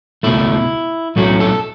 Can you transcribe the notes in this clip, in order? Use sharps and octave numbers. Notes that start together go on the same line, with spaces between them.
C#2 B2 A3 E4
B1 A2 F#3 A3 C#4 F#4
A4